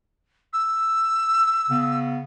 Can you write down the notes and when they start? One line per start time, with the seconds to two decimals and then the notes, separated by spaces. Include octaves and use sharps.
0.53 E6
1.69 C#3 B3